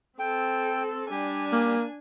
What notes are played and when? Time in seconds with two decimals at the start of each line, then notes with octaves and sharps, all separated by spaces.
0.19 C4 A4 G5
1.11 G3 D4 G4 G#5
1.52 A#3